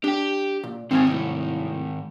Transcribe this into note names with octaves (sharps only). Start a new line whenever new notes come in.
D4 G4 G5
A#2
G#2 D#3 C4 F5 G#5
C2 A2